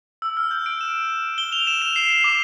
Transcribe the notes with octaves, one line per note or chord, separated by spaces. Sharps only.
E6
F6
G6
D7
E7
G7
F7
E7
E7
C7
C7
D6